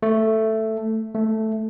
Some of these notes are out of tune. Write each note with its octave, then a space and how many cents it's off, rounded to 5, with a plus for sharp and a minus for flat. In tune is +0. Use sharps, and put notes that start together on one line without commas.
A3 +5
A3 +0